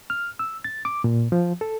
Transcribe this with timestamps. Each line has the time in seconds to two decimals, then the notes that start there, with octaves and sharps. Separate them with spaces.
0.10 F6
0.39 E6
0.64 A6
0.85 D6
1.04 A#2
1.32 F3
1.61 A4